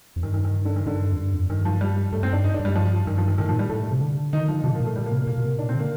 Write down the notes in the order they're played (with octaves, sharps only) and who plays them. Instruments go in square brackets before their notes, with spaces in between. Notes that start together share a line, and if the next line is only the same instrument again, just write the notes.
[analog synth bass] F2
[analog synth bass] G2 [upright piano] D#3
[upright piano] D#3
D#3
D3
D#3
[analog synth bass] G2 [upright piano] D3
[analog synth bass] F2
G2
F2
[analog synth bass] G2 [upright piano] D#3
[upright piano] F3
G3
[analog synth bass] G2 [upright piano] A3
[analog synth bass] G2 [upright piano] C4
[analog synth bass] G2 [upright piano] D4
[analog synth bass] G2 [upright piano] D#4
[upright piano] D4
[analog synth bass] G2
[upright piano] G3
F3
[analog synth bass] G2 [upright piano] D#3
[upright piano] F3
D#3
[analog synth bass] A2 [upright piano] D#3
[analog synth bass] A#2 [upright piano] F3
[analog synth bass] A2 [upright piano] G3
[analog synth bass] A2 [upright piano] A3
[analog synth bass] C3
D3
[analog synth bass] D#3 [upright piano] D#4
[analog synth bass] D3 [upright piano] F3
[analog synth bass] C3 [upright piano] F3
[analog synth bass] A2
[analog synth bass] A#2 [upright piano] A#3
[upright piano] A3
[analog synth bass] A2 [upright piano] G3
[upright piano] A#3
[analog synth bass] C3
[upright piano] A#3
[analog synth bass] A#2 [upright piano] A#3
[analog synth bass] A#2
C3
[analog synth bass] A#2 [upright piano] D4
[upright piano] C4
[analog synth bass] D3
[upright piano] A#3